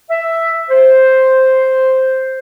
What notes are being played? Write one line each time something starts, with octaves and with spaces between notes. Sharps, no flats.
E5
C5